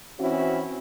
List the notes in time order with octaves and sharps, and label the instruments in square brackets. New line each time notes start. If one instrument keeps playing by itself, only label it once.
[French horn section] E3 C4 C#4 E4 F#4